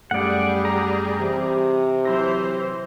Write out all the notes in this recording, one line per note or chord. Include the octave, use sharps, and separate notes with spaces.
F#2 G3 A3 G4 G#4 D5 F#5
A#5
C3 E3
E3 F#3 C5 C6 A#6